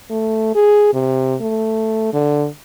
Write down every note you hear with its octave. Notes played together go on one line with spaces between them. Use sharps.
A3
G#4
C3
A3
D3